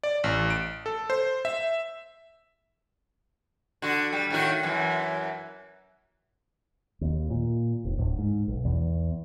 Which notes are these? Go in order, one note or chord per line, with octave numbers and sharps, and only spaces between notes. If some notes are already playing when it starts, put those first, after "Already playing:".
D5
A1
D7
A4
C5
E5
D3 F#4
G3
A2 D#3 F#4
F#2 E3
D#2
A#2
F1
D1
G#2
B1
E2